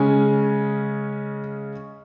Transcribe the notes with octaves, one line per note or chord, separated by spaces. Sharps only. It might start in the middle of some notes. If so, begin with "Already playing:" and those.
Already playing: C#3 G#3 C#4 G#5